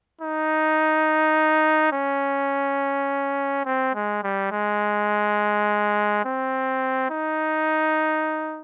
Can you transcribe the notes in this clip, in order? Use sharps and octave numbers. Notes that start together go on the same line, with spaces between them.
D#4
C#4
C4
G#3
G3
G#3
C4
D#4